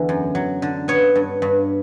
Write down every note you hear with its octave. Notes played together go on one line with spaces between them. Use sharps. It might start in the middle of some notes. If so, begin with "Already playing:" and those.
Already playing: E2 D3
F#2
F#3
D3
B3 C#5
G2
G2